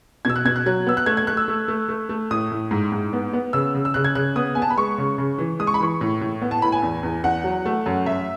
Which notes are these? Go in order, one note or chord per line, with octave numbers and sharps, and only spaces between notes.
B2 E6 G#6
F#6
B2 G#6
F#6
F#3 F#6
B3 E6
F#6
A3 G#6
G#6
A3 F#6
E6
A3
A3
A3
A3
A2 D#6
A2
G#2
G#2
B3
B3
C#3 E6
C#3
E6
C#3 F#6
G#6
C#3 F#6
B3 D#6
B3 G#5
A5
B5
G#3 C#6
C#3
C#3
E3
G#3 D#6
C#6
B5
E3 C#6
A2
A2
B3
A5
A2 B5
G#5
E2
E2
E2 F#5
F#3
A3
F#2
F#2 E5